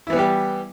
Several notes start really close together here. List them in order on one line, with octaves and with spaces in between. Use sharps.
E4 E3 B3 G3 G4